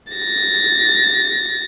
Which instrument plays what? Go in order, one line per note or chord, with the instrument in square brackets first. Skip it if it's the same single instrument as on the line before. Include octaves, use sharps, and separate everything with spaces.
[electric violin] A6 A#6